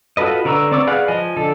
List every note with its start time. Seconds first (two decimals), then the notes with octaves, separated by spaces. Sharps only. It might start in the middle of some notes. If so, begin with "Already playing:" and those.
0.17 F4 F#4 A4 B4 D#5
0.45 D3 B4 A#5 C#6 E6
0.72 C4 D5 C#6 D6 E6
0.87 G#4 B4 D5 F5 F#5
1.08 F3 D#5 G#5
1.37 D3 A4